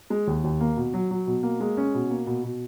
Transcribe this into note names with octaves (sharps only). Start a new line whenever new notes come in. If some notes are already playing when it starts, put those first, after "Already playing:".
G#3
D#2
D#2
A#3
B2
F#3
F#3
B2
A#3
G#3
C#4
B2
A#3
B2
B2